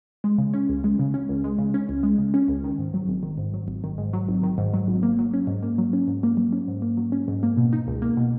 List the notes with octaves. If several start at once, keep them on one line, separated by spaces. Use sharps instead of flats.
G#3
C#3
C#4
C#2
G#3
C#3
C#4
C#2
G#3
C#3
C#4
C#2
G#3
C#3
C#4
C#2
D#3
G#2
F#3
G#1
D#3
G#2
F#3
G#1
D#3
G#2
F#3
G#1
D#3
G#2
F#3
G#1
A#3
F#3
C#4
G#2
A#3
F#3
C#4
G#2
A#3
F#3
C#4
G#2
A#3
F#3
C#4
G#2
A#3
B2
D#4
C#2
A#3
B2